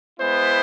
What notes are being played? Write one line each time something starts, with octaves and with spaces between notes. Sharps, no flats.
G#3 B3 E4 C5